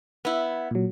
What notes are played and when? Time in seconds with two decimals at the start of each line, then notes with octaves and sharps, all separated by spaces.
0.25 B3 E4
0.71 A#2 F#3